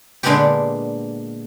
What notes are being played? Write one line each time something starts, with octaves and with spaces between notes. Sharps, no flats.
A#2 D3 G#3 A#3 B3 G4